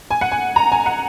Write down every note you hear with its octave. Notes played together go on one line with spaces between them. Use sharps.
G#5
F#5
G#5
A#5
G#5
F#5